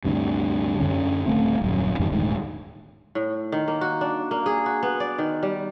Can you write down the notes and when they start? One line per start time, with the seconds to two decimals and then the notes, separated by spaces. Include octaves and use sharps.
0.05 D2 G2 C3
0.80 F#2 D3 C#4
1.26 D#1 A3 C4
1.62 D#1 F#2
1.99 F2 G#2 C3 D#3
2.12 D#1 D2 G#2 G#3
3.15 A2
3.52 D#3
3.68 A#3
3.81 F#4
4.01 D4
4.31 A#3
4.46 G#4
4.66 F#4
4.83 B3
5.00 D5
5.18 D#3
5.43 G3